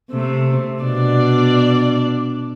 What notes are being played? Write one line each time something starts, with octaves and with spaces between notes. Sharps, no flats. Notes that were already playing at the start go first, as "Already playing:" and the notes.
C3 A3
B2 D4 D5